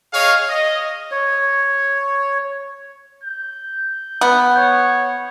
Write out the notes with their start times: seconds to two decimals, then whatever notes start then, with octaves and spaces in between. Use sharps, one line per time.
0.13 G#4 C#5 D#5 F5
0.48 D#5
1.11 C#5
3.24 G6
4.21 B3
4.57 C#5